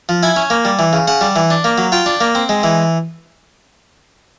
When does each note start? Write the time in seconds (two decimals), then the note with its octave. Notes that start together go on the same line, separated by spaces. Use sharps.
0.09 F3
0.23 E4 G#5
0.36 C#4
0.50 A#3
0.65 G3
0.79 E3
0.93 C#3
1.07 C#3 F#5
1.21 G3
1.36 E3
1.50 D4
1.64 A#3
1.78 F#3
1.92 F4 G5
2.06 D4
2.21 A#3
2.35 C4
2.49 G#3
2.63 E3